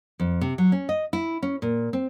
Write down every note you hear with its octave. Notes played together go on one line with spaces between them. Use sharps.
F2
C3
F#3
C#4
D#5
E4
C#4
A#2
C4